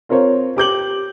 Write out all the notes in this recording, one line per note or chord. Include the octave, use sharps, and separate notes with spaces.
C4 F4 A#4 C5 C#5
G4 D6 G6 F#7